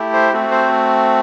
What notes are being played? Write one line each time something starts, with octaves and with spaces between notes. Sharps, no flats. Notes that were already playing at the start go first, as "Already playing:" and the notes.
Already playing: A3 E4 G4
C5
A3 C4 F#4
C5